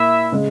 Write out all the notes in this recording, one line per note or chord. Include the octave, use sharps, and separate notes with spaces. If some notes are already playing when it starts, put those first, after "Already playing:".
Already playing: A#2 A#3 E4 E5
C#3 G#3